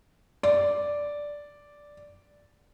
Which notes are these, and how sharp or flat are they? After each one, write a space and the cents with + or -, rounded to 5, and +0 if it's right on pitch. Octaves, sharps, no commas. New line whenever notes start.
D5 -5